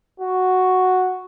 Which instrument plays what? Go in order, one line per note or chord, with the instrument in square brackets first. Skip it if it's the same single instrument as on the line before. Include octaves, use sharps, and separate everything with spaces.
[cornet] F#4